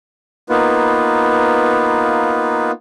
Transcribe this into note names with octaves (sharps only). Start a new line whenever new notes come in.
A#3 B3 D#4 F4 B4